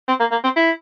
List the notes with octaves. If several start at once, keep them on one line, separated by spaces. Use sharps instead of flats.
C4
A#3
A#3
C4
E4